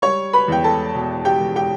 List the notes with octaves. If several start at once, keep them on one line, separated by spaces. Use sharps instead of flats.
G3 C#5 C#6
B4 B5
E2 G5
A4 A5
B2
G4 G5
E1
G4 G5